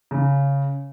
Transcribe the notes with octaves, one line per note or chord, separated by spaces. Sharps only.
C#3